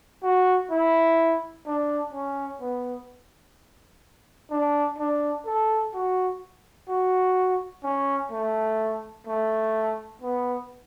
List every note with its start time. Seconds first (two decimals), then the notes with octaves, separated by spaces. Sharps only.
0.23 F#4
0.71 E4
1.66 D4
2.13 C#4
2.61 B3
4.51 D4
4.99 D4
5.46 A4
5.94 F#4
6.89 F#4
7.84 C#4
8.32 A3
9.27 A3
10.22 B3